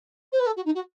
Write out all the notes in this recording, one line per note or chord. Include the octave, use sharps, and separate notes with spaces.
C5
B4
A4
F#4
D#4
F#4